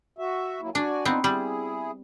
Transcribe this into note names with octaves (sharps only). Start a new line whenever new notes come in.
F#4 E5
F#3 A#3 E4
D4 F#4 D5 G#5
B3 C4 D4 D#4 F4
G3 E4 G#4